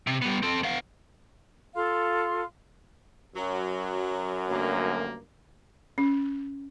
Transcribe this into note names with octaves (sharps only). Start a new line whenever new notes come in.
C3
G3 B3
C4 A4
B3 F5
F4 A4 F5 C6
F#2 F#3
D2 G2 A#3
C#4